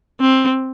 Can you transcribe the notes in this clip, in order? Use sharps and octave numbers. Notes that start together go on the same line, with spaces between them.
C4